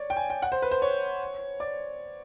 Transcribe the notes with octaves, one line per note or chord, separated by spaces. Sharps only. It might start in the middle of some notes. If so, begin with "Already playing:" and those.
Already playing: C#5 D5
G5
G#5
G5
F#5
C5
B4
C5
C#5
D5